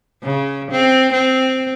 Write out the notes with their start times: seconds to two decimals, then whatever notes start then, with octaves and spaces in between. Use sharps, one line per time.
0.23 C#3
0.71 C4
1.12 C4